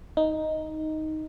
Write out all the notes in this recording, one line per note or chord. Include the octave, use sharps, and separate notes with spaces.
D#4